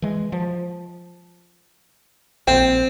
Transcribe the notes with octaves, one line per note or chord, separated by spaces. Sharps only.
E3 G#3
F3
A#1 C4 G5